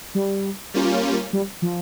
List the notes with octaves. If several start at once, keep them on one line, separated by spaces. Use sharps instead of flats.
G3
G3 A#3 C#4 F4
G3
F3